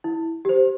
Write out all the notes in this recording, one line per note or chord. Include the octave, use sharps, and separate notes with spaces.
E4
G4 C5